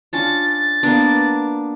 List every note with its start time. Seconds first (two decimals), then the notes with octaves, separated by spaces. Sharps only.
0.13 C#4 D4 F4 A6
0.83 A#3 B3 D4